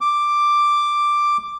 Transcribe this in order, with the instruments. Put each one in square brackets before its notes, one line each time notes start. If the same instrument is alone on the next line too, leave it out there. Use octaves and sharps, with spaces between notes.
[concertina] D6